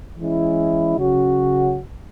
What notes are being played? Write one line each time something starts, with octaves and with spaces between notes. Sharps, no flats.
E3 G#3 C#4 E4
C#3 F#3 C#4 F#4